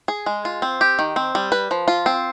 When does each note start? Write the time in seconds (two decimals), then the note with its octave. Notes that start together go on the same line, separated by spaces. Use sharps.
0.08 G#4
0.26 G#3
0.45 F4
0.62 C4
0.81 G4
0.99 D#3
1.16 C4
1.35 G3
1.52 B4
1.71 F3
1.88 F4
2.06 C4